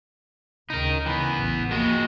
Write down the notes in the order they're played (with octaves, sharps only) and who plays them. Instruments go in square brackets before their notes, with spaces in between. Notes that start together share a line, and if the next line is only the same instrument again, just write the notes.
[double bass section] D2 C#3 [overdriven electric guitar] D#4 A#4
[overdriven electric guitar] E3 B3
[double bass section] A1 E2
[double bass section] F3 A#3 [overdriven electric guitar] G#3 F#4